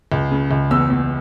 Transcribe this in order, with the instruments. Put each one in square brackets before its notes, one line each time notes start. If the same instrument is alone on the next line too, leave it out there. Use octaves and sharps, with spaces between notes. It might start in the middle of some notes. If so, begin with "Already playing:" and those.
[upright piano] C#2
C#3
C#2
E2 E6
E2